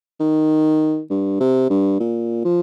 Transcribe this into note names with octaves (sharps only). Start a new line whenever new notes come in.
D#3
G2
C3
G2
A#2
F3